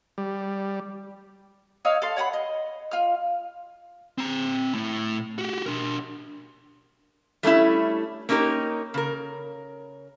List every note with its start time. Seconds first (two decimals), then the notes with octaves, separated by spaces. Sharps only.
0.18 G3
1.85 D#4 C#5 F5 E6
2.02 A4 F5 C6
2.16 C#5 F#5 G#5 B5
2.33 D#5
2.91 F4 F6
4.18 C4 A#5
4.74 A2
5.38 F#4 G4
5.66 D4 A#4
7.43 G3 A3 C#4 E4
8.29 A#3 C#4 D#4 G4 A#4
8.94 C#3 A#4